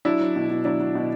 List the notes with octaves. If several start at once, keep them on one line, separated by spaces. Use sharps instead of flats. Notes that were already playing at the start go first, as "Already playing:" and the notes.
F#3 D4 E4
F#3
B2
B2
F#3 D4 E4
F#3
B2